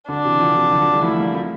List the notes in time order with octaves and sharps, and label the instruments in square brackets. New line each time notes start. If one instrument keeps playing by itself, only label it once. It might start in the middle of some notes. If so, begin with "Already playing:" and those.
[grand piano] D3 [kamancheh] D4
[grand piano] C3 E3
D3 F3
C3 E3
D3 F3
D3 F3
E3 G3
[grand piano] F3 A3 [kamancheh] E4
[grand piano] G3 A#3
F3 A3